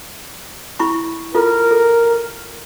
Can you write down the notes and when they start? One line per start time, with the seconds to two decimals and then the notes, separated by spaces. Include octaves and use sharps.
0.79 E4 B5 C#6
1.35 F4 A4 A#4
1.71 A4